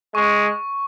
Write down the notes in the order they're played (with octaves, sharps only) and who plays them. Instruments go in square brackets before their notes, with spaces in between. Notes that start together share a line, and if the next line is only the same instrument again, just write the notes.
[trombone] G#3 [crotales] C#6